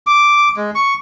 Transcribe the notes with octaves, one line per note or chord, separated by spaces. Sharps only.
D6
G#3
C#6